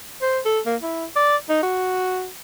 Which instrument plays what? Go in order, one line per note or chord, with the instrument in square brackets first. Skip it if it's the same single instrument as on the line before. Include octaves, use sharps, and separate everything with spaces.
[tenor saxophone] C5
A4
A#3
E4
D5
D#4
F#4